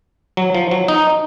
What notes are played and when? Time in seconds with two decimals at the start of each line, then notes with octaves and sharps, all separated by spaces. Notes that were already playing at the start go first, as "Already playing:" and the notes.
0.37 F#3
0.55 F3
0.71 F#3
0.88 D#4